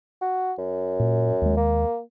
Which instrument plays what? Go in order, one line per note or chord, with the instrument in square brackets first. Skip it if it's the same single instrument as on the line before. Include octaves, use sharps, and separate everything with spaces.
[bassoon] F#4
F#2
[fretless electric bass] A#2
D#2 G#3
[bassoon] A#3